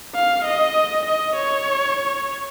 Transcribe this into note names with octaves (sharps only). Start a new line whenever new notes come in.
F5
D#5
D#5
C#5